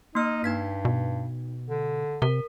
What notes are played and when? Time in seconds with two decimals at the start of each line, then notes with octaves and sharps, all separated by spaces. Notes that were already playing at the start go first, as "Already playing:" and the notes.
0.15 A#3 D#4 F6
0.44 G2 D#4 G#6 B6
0.85 B2
1.69 D3
2.22 C3 A#4